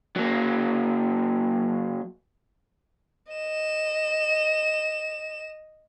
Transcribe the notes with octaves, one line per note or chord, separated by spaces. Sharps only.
F#3 A#3
D#5 E7